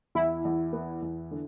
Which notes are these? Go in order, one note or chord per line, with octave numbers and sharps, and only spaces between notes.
E2 E4
E2
B3
E2
D3